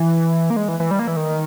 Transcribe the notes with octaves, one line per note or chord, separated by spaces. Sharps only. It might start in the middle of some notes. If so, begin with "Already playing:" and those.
Already playing: E3
A#3
G#3
E3
E3
G3
A#3
E3
D#3